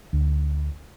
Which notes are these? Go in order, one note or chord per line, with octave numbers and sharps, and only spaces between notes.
D2